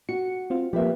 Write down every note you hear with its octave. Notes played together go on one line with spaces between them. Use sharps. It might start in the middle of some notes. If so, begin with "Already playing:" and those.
F#4 C#7
C4 F4
F3 A#3 G4 B4 E5